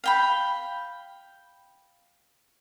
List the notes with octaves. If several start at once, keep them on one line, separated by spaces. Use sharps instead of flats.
F5 G5 B5